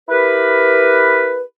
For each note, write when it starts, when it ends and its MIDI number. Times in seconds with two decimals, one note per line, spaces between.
0.09 1.41 64
0.09 1.41 67
0.09 1.41 70
0.09 1.41 71